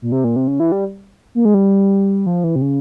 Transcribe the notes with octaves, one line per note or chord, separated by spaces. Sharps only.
A#2
C3
A#2
C3
C#3
E3
G3
A#3
G#3
G3
F3
E3
C3
C#3